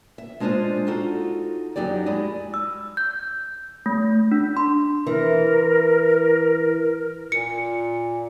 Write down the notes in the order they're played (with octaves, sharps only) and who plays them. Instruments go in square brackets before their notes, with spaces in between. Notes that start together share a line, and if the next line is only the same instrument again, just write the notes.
[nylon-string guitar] E5
G#3 D4 F4 C5 D5 D#5
D#4 F4 F#4 A4
F#2 F#3 D#4 G4 D5
G#3 E4 D5 D#5
[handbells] E6
G6
A3
D4
C6
[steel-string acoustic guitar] E3 [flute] A#4
[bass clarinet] A#2 [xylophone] C#7